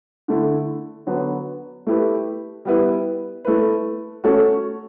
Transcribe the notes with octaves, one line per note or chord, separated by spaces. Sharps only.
D3 A3 E4
D3 F#3 B3
A3 E4 G4 B4
G3 B3 E4 B4
A3 E4 B4
A3 C#4 F#4 A4